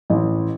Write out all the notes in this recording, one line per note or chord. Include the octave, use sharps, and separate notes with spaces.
A1